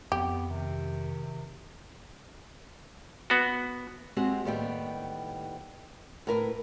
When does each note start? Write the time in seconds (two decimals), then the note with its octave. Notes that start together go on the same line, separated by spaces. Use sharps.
0.12 F2 B3 G4
0.49 C3 D#3
3.30 B3 F#4
4.17 G#3 C4 F#4 G4
4.45 D#2 A2 G3 B3 G5
6.27 A2 A#4 B4